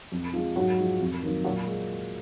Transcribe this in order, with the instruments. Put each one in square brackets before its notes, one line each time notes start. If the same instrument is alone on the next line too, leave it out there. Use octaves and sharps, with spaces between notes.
[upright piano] F2
F3 G#3
G#2 F#3 F#4
F3 G#3
F2
D#3 F#3 A#3
A#2 F#3 F#4
G#3